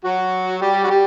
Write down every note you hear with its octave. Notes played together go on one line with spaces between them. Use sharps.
F#3 F#4
G3 G4
F#4
G3 G4